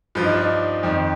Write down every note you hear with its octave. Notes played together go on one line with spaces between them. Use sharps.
G2 F3 F4
D#4
D4
D#4
F2 D#3